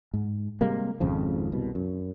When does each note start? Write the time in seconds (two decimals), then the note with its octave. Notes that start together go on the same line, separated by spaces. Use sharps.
0.14 G#2
0.61 C3 G3 G#3 A#3
1.00 G#1 F2 C#3 F3
1.52 C2 B2
1.75 F#2